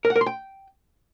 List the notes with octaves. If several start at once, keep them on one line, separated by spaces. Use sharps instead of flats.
A#4
F#5
A#4
C6
G5